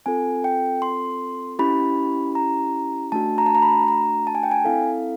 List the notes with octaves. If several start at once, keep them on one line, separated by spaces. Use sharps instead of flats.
C4 F4 A4 G#5
G5
C6
C#4 E4 G4 B5
A#5
A3 D4 F#4 A5
A#5
A5
A#5
B5
A#5
A5
G#5
G5
G#5
C4 E4 A4 F5